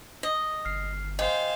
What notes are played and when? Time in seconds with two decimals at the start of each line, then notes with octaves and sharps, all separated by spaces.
0.23 D#5
0.65 G1 F6 C7
1.19 C5 D#5 F5 G5 G#5